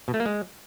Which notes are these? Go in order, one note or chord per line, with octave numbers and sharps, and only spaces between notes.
B2
A3
A#3
G#3